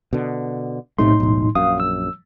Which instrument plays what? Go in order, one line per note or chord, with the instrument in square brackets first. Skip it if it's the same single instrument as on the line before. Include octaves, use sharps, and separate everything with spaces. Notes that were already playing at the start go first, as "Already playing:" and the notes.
[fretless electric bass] B2 D3
[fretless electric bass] B1 C3 A3 [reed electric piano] A2 D#4 C6
[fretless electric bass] E1 B1
[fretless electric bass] A#1 F#2 [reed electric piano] F5 D#6
[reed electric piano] E6